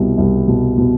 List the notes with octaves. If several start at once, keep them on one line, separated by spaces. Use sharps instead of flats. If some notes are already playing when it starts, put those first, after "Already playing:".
Already playing: C2 B2
C2
B2
B2